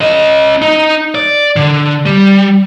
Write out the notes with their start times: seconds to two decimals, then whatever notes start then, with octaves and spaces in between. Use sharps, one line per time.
0.01 C#4 D#5
0.62 D#4
1.15 D5
1.56 D3
2.06 G3